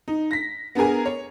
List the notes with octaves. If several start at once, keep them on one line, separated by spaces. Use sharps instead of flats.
D#4
A#6 B6
B3 D4 G#4 A#4 G#5
C#5